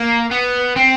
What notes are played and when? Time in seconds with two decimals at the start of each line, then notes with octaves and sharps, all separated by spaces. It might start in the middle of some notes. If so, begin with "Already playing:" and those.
Already playing: A#3
0.31 B3
0.76 C4